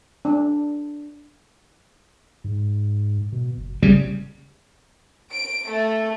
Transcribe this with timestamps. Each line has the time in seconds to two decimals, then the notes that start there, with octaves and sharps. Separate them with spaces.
0.25 D4
2.44 G#2
3.32 B2
3.57 F#1
3.82 A1 C#3 G3
5.32 D7
5.70 A3